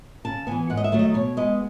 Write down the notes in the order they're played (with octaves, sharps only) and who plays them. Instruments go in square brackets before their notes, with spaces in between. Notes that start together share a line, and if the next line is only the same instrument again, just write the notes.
[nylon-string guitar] C#3 A5
E3 B3 G#5
G#2 F#5
D#5
E5
D#3 F#3 A3
D#5
B2 C#5
G#3 B3 D#5